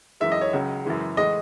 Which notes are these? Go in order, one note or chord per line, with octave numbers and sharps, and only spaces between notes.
F#2 E3 G#3 E5
D#5
C#5
C#2 C#3 F#3
F#2 C#3 E3 G#3
A2 E3 G#3 D#5